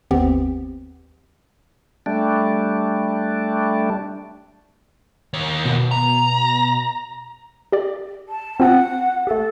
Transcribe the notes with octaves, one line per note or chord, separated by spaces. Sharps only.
G1 D#2 B3 C4 G4
G3 A3 D4
D#2 C#5
B2
A#5
G4 D5
A5
C4 F4 F#5 G5
A3 G4 A4